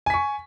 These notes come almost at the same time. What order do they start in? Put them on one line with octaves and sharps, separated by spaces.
G#5 B6 C#6